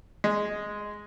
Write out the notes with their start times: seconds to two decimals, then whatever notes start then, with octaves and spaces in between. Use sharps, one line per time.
0.24 G#3